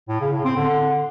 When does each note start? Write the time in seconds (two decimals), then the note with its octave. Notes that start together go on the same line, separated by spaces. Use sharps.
0.09 A2
0.20 C#3
0.32 A2
0.44 C4
0.56 D3